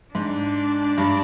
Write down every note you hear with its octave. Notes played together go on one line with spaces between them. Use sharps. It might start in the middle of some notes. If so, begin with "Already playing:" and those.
G#2 D4
G2